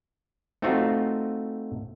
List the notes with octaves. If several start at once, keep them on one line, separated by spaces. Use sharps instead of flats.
A3 C4 D#4 F4 F#4